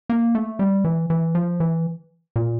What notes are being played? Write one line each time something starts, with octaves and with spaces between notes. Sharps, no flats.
A#3
A3
G3
E3
E3
F3
E3
A#2